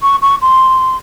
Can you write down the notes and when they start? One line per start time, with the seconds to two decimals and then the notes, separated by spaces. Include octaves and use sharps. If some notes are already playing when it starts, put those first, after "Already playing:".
0.02 C#6
0.22 C#6
0.41 C6